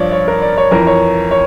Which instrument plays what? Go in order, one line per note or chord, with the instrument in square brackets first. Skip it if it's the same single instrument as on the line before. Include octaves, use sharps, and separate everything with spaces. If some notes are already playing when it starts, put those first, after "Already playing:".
Already playing: [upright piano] G2 F3 C#5 D5
C#5
A#4
D5
C#5
F2 E3 A#4
C#5
C#5